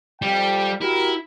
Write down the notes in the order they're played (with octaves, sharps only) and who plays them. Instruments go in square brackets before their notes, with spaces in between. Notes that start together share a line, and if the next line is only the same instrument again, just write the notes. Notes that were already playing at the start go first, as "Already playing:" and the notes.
[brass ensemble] F2 G5 [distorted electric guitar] G3
[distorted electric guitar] E4 [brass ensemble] F#4 G4 A#4